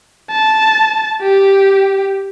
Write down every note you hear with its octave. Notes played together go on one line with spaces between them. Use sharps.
A5
G4